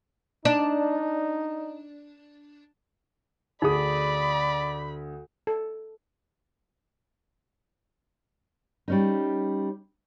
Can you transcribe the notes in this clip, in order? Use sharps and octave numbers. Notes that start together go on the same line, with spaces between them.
D4 D#4
D2 D#4 G#4 D5 B5 D#6
A4
G3 C#4 D#4